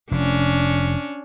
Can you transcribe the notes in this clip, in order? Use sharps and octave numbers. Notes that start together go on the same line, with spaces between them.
F1 C#4 D4